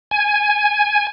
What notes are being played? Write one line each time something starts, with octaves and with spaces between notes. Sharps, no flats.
G#5